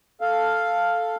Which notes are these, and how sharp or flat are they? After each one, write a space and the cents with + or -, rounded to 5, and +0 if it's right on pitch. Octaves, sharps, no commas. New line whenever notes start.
A4 +0 F5 +0